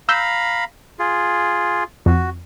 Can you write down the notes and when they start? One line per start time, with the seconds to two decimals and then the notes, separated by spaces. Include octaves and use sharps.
0.09 F5 A#5 B5 E6 G6
0.99 F4 G#4
2.06 F2 F#4